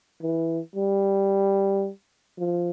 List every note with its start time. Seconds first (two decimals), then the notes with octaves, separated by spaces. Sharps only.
0.21 E3
0.76 G3
2.38 F3